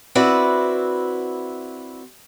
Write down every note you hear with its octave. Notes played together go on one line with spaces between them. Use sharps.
C4 E4 F#4 B4 D5